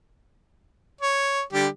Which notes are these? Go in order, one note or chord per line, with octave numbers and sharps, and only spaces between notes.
C#5
D3 G3 G4